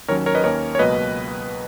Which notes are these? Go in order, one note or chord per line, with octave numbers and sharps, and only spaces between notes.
D#2 D#3 F#3 C#4 A#4 C#5
A#4 C#5
B4 D#5
D#2 D#3 A#3 C#4 A#4 C#5
C#5
C#2 B2 F#3 A#3 B4 D#5